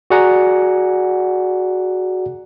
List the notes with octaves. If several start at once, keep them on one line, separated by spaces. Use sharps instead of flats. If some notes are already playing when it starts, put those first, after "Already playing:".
F#4 G#4 D5 F#5 G#5 A#5